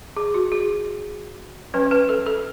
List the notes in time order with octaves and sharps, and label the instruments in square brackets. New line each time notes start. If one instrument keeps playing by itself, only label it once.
[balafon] G#4
F#4
G#4
F#3 C#4 B4
B4
A4
A4